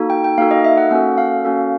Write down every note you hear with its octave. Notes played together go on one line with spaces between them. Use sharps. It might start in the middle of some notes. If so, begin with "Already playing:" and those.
Already playing: A#3 D#4 F#4 A4
G5
G5
A#3 D#4 F#4 A4 F5
D#5
E5
F#5
A#3 C#4 F#4 A4 F#5
F5
A#3 C#4 F#4 A4